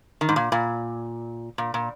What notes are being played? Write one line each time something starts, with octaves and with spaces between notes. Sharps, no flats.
D#3
G#2
A#2
A#2
A#2
A#2